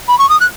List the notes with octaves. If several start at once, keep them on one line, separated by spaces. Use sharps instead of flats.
B5
C#6
D#6
F#6